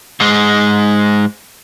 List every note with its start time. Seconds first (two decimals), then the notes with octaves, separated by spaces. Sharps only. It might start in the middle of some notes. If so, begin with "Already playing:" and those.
0.20 G#2 G#3